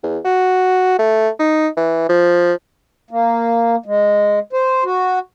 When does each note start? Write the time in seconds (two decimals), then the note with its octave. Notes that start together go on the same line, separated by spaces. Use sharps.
0.03 E2
0.25 F#4
0.99 A3
1.39 D#4
1.77 E3
2.09 F3
3.11 A#3
3.86 G#3
4.53 C5
4.85 F#4